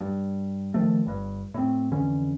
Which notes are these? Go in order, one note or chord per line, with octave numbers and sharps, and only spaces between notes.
G2
D#3 F3 A3
G1 G2
A2 C4
F2 D3 E3 C#4